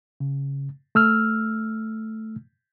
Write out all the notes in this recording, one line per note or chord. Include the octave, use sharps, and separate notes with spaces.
C#3
A3 E6 F6